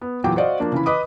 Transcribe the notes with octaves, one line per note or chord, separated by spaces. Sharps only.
B3
E2 A#2 F#3 G5 D6
F#4 C5 D5 D#5 F5
F3 A#3 D4
C#3 E3 B5
B4 D#5 B5 D6 D#6